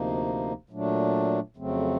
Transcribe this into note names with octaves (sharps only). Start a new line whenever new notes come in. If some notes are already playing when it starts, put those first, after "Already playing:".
Already playing: D2 C3 F3 A#3 D#4
A#2 F#3 A3 D4
F2 C#3 F#3 A3 C4